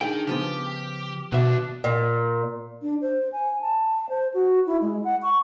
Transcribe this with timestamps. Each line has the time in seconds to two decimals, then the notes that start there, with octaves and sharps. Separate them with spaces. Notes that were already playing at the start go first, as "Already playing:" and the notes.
0.01 D#3 D4 D#4 G#4 G5
0.27 C#3 F3 B3 G4 F6
1.32 D#2 B2 D#3 D4 F#4 E5 D6 F#6
1.84 A#2
2.82 D4
3.01 C5
3.32 G#5
3.61 A5
4.09 C5
4.34 F#4
4.66 E4
4.81 G#3
5.04 F#5
5.22 C#6